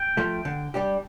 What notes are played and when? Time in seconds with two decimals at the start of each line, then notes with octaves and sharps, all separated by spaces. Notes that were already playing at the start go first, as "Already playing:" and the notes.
Already playing: G5
0.17 F3 A3
0.45 D3
0.74 G3 D4 G4